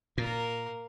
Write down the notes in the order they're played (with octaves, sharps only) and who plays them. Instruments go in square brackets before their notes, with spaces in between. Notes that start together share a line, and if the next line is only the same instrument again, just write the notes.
[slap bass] A#2 [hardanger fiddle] A#3 A#4